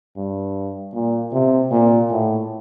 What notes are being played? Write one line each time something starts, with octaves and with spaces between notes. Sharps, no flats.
G2
A#2
C3
A#2
A2